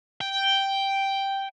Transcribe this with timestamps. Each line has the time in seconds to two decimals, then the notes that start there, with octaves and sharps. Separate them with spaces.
0.21 G5